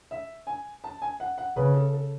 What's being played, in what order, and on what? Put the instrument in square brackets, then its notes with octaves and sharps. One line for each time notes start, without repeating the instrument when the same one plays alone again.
[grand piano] E5
G#5
A5
G#5
F#5
F#5
[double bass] C#3 [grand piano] B4
[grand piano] A4
A4